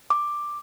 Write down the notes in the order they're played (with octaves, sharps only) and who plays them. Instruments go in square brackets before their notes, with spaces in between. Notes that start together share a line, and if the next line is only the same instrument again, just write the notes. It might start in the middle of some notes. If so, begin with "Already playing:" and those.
[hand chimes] D6